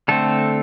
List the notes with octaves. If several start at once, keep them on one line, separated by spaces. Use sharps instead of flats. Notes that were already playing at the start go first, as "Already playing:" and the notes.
D3 A3 C4 A4